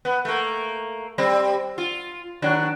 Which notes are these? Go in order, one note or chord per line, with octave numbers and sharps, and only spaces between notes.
B3
A3 A#3
G3 C4
F4
D#2 F#3 D4